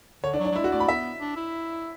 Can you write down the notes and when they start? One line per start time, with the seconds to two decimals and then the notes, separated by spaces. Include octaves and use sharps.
0.23 D3 C#5
0.33 D4
0.39 F#3
0.45 D4
0.52 F#3
0.55 G#3 E4
0.64 F#4
0.72 A3 D5
0.80 B5
0.88 B3 E5
1.20 D4
1.36 E4